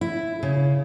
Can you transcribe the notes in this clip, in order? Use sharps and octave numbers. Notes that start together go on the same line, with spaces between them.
E4
C#3